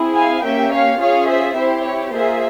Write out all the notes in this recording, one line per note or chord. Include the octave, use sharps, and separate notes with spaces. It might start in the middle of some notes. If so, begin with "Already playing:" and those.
Already playing: C4 E4 G#4
F5 G#5
A#3 C#4 G4 E5 G5
C#5 F5
C#4 F4 G#4 C#5 F5
C5 E5
C4 E4 G4 C5
C#5
A#3 F4 G#4 C5 E5